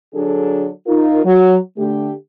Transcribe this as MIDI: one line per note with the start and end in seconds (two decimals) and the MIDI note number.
0.14 0.67 50
0.14 0.67 54
0.14 0.67 62
0.14 0.67 68
0.14 0.67 69
0.86 1.23 63
0.86 1.23 65
0.86 1.23 70
1.24 1.56 54
1.77 2.11 50
1.77 2.11 57
1.77 2.11 67